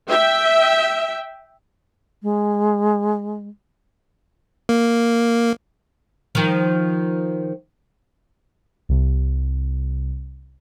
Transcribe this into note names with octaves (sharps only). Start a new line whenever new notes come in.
E5 G5
G#3
A#3
D#3 F3
C2 C3